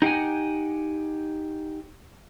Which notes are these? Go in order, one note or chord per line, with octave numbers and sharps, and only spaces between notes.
D#4 G4 F5 F#5 G#5